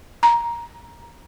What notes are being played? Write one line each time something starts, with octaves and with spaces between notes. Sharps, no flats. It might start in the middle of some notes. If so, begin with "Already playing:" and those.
A#5